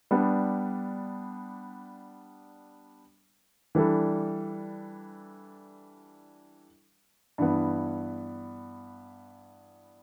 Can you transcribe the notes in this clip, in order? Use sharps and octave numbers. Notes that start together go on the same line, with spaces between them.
G3 B3 D4
E3 G3 D4 A4
G2 E3 B3